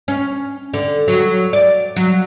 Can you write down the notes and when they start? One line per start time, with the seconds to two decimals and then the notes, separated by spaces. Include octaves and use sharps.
0.08 C#4
0.74 D3
1.08 F#3
1.53 D5
1.96 F#3